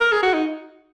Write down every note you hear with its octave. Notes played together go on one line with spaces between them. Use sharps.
A#4
G#4
F#4
D#4